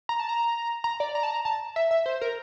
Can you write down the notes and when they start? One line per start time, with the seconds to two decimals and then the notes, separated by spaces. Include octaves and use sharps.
0.09 A#5
0.20 A5
0.29 A#5
0.84 A#5
1.00 D5
1.15 A#5
1.23 A5
1.31 A#5
1.45 A5
1.76 E5
1.91 E5
2.06 C5
2.21 A#4